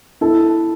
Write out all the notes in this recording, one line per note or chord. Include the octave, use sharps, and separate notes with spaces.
E4 A4